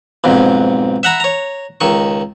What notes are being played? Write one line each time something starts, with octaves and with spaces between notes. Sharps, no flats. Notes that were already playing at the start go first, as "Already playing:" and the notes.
B1 F2 G#2
E5 F#5 A#5 B5
C#5 A#5
C#2 D#3 C#6